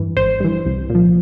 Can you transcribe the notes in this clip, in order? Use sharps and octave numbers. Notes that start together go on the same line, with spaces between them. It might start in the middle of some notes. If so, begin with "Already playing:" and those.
Already playing: G2 E3
G#1 C5
G2 E3
C2
A#2
F3